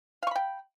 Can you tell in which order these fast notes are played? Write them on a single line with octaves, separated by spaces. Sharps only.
F5 C#6 B5 G5